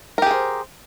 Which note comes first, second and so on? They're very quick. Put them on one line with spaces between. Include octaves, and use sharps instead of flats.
A#4 G4 G#4 C5